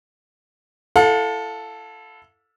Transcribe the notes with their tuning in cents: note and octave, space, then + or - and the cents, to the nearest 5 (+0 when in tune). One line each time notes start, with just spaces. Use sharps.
E4 +30 A4 +0 F5 +45